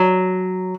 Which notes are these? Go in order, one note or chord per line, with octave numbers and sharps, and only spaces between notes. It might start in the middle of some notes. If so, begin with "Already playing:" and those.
Already playing: F#3